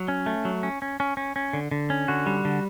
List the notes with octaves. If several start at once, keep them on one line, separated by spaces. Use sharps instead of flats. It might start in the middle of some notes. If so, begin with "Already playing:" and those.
Already playing: F#3
C#4
A3
F#3
C#4
C#4
C#4
C#4
C#4
D3
D3
C#4
D3 F#4
G3
D3